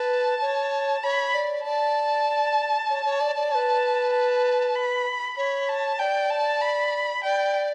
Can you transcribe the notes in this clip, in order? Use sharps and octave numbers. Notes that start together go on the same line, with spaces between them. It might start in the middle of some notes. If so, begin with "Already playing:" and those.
Already playing: B4 A5
C#5
C#5 B5
D5
D5 A5
C#5
C#5
D5
D5
B4 C#5 A5
A5
B5
C#5 B5
A5
D5 G5
A5
B5
D5 G5